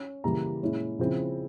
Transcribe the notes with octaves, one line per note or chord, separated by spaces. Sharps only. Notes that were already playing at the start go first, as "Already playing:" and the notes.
Already playing: C#4
C#3 E3 G3 A#3 E4 A#5
A#2 G#3 C#4 E4
C#3 F3 C4 E4